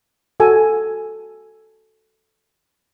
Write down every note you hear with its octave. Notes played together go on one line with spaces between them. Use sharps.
F#4 A4 G#5